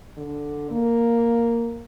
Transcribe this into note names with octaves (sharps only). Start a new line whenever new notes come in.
D3
A#3